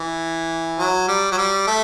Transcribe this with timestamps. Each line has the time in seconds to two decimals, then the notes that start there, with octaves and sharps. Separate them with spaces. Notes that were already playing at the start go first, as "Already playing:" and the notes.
Already playing: E3
0.79 F#3
1.08 G3
1.32 F#3
1.38 G3
1.67 A3